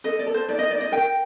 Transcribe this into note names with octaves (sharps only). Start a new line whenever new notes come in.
A4 D#5
D5
A4
C5
D#4 D5
D#5
D#4 D5
D#5
A#4 G5